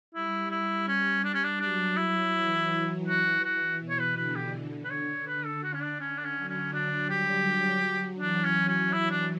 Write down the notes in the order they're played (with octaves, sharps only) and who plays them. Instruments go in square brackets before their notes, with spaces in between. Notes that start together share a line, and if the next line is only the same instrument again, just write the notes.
[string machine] G3 [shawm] E4
[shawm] E4
C#4
D4
C#4
D4
[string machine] F#3 [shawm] D4
[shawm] E4
[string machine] E3
[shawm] F#4
F#4
[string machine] B2
[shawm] C#5
B4
[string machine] D3 [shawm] B4
[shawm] G4
B4
C#5
B4
A4
F#4
C#4
D4
[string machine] D3 [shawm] C#4
[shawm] D4
C#4
[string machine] F#3
[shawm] C#4
[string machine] F#3 [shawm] D4
[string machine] G3 [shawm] G4
[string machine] F#3
[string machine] E3 [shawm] D4
[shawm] C#4
[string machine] F#3
[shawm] C#4
E4
D4